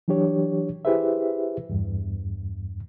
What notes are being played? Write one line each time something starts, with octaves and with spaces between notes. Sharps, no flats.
E3 F#3 D4 G4 C#5
E4 G4 G#4 B4 C5 E5
E2 G2